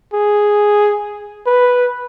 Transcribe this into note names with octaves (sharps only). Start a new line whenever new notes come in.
G#4
B4